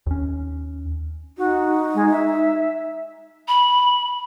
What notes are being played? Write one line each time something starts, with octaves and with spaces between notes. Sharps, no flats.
D#2 C#4
D#4 F#4
G#3
E5
B5